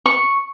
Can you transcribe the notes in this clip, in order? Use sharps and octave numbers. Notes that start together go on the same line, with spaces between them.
C#6